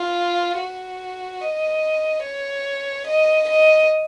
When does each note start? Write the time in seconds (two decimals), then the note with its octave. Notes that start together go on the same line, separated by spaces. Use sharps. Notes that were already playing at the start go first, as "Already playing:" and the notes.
Already playing: F4
0.58 F#4
1.41 D#5
2.24 C#5
3.07 D#5
3.49 D#5